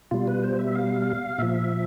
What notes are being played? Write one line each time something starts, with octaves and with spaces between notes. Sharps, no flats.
B2 G3 F4
B4
C5
E5
F5
A#2 F3 E5